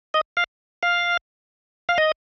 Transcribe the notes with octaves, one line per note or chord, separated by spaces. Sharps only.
D#5
F5
F5
F5
D#5